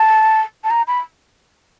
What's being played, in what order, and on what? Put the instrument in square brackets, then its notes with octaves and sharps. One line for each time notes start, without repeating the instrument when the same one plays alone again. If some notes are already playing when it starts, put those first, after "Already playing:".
Already playing: [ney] A5
A5
A#5
B5